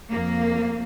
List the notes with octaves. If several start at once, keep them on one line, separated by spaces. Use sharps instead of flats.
F2 A#3